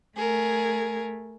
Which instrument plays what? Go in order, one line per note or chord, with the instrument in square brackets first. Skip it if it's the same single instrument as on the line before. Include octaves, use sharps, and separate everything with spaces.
[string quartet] A3 G#4 A#4